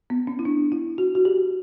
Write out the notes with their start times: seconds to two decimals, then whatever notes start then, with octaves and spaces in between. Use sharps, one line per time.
0.10 B3
0.27 C#4
0.39 E4
0.45 D4
0.72 E4
0.98 F#4
1.15 F#4
1.25 G4